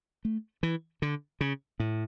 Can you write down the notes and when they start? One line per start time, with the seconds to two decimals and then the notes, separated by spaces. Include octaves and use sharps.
0.25 A3
0.63 E3
1.02 D3
1.41 C#3
1.80 A2